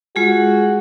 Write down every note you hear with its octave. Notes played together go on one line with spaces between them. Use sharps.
G#3 F4 F#4 G#4